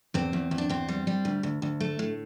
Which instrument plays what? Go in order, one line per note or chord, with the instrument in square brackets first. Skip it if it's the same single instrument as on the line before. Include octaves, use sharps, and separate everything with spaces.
[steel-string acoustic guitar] E2 C4
E2
E2
D4
E2 C4
G3
G3
D2
D2
D2
A3
A2